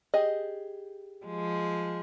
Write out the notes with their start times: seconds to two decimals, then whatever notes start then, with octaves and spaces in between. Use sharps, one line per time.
0.14 G4 G#4 D#5
1.26 F3 G#3